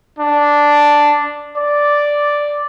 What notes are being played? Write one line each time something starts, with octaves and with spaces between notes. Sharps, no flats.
D4
D5